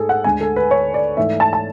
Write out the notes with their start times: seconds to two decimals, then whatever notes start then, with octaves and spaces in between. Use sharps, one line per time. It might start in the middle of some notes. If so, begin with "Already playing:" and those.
Already playing: G#2 A3 G#4 A4
0.09 F#5
0.24 D2 D3 G#3 G#5
0.41 A4
0.56 B4
0.71 C#5
0.94 D5
1.17 G#2 E3 A3 E5
1.40 A5
1.53 A5